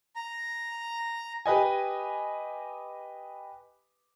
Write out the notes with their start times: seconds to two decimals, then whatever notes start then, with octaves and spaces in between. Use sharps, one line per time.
0.16 A#5
1.46 G4 B4 D#5 G#5